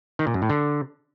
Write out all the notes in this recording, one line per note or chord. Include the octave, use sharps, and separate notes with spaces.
D#3
A#2
F#2
A2
D3